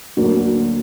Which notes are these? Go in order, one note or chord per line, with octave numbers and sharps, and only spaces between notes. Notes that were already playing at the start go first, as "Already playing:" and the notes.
D2 D3 F#3 A#3